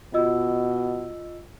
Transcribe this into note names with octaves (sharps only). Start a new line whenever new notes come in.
B2 F4 D#5 E6